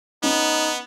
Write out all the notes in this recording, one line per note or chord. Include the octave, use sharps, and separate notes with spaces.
B3 C#4 D#4